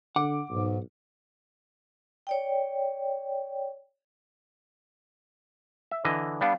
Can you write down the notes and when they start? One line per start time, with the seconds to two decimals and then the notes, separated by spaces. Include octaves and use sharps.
0.16 D3 F#5 D6
0.50 B1 G#2
2.27 C#5 D5 G5
5.91 E5
6.05 D3 E3 D#5
6.41 G3 B3 D4 F5